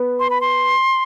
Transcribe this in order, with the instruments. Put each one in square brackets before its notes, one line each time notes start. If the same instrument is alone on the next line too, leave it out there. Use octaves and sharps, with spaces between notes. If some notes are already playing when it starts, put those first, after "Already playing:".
Already playing: [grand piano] B3
[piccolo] C6
B5
C6